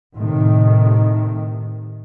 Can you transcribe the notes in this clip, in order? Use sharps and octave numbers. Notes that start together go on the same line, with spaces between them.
A2 C3 D#3